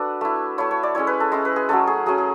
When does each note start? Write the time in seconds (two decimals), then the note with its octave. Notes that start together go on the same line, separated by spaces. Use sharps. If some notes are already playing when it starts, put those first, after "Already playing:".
Already playing: D4 F#4 A4 B4
0.21 A3 E4
0.58 A3 E4 C#5
0.71 C#5
0.83 D5
0.95 G#3 C#4 E4 C#5
1.07 B4
1.20 A4
1.32 G#3 C#4 E4
1.45 B4
1.56 G#4
1.69 F#3 A3 C#4 A4
1.87 G#4
2.06 F#3 A3 C#4 G#4
2.18 G#4